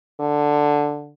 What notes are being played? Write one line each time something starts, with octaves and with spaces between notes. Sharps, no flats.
D3